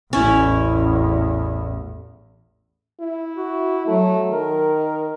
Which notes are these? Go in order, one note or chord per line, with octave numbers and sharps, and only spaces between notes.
A1 E2 C#4 E4
E4
F#4
F#3 A3
D#3 A#4